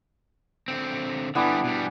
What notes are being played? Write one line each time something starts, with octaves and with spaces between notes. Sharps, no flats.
D3 C4
D3 E3 G3 B3 D4
B2 G3